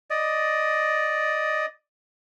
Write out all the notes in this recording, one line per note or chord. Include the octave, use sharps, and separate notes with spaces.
D5 D#5